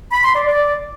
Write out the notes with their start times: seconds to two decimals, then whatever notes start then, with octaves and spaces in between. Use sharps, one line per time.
0.12 B5
0.24 C6
0.35 D5
0.46 D5